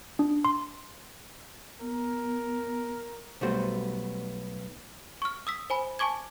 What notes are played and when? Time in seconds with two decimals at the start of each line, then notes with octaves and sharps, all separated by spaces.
0.19 D4
0.45 C6
1.81 B3 A#4
3.41 B1 G3 A3 B3 F#4 C5
5.22 C#6 F6
5.47 D#6 E6 B6
5.70 C5 G#5 B5
5.99 G#5 A5 C#6 D6 G#6